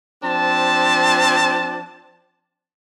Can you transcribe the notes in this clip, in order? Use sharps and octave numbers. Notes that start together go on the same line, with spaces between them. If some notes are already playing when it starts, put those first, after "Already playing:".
F3 C4 D4 A5